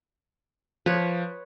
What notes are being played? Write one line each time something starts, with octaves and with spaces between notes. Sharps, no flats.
F3 B4 C#5